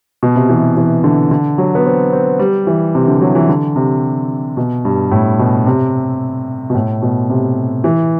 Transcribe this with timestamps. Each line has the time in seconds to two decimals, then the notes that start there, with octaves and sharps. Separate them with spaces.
0.23 B2
0.36 C3
0.49 E3
0.77 E3
1.04 D3
1.31 D3
1.58 F#3
1.75 B3
1.85 C4
2.12 C4
2.39 G3
2.67 E3
2.95 C3
3.08 D3
3.21 F#3
3.35 E3
3.49 D3
3.76 C3
4.57 B2
4.85 G2
5.12 A2
5.39 B2
5.66 C3
6.70 B2
6.75 A2
7.02 B2
7.30 C3
7.84 E3